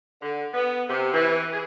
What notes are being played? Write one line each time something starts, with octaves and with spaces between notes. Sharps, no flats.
D3
B3
C3
E3
G#4